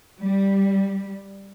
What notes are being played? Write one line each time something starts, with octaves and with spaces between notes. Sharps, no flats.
G3